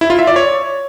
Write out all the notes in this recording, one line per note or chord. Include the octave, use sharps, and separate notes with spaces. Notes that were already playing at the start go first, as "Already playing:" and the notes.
E4
F4
E5
D5
C#5